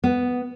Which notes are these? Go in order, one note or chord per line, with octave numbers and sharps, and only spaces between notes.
B3